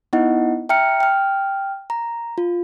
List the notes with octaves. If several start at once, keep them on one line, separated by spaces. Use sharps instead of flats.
B3 D#4 E4 D#5 F#5
E5 G5 A#5 F6 C#7
G5 F6
A#5
F4